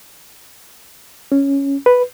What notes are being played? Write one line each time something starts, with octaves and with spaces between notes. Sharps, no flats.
C#4
B4